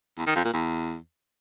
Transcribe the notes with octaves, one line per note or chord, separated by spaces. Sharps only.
E2
D#3
F2
A#2
E2